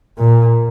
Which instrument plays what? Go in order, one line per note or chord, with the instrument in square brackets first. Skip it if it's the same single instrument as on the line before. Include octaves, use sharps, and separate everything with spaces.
[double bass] A#2